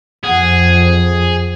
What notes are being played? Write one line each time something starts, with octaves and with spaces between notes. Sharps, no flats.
F2 G#4 F#5